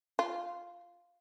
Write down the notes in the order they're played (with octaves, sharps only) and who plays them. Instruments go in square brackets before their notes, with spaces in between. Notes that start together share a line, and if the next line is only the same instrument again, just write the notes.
[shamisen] F4